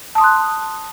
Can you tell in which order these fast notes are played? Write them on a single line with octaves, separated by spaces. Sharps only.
A5 D#6 C6 F#6